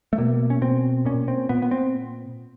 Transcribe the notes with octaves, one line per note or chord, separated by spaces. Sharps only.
A3
B2 A#3
C#4
B2 C4
A#2 C#4
C4
A#2 B3
B3
C4